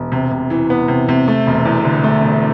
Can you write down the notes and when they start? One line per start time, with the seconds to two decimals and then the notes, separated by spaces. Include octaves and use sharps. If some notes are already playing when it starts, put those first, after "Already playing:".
Already playing: E1
0.12 C3
0.31 C3
0.50 E3
0.70 B3
0.88 C3
1.09 C3
1.28 A3
1.47 E1
1.66 E2
1.84 D3
2.04 A3
2.24 E1